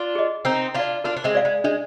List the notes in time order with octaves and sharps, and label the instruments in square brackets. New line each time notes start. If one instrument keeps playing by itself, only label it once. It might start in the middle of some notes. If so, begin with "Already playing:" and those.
Already playing: [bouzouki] D4 F4
[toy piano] G#4 D#5
[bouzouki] C4 D#4 [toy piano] A#4
[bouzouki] D4 F4 [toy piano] D5 F5
[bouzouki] D4 F4 [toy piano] A#4
[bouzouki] D4
G#3 C4
[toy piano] D5 F5
[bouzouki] G#3
[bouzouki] G#3 [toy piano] D4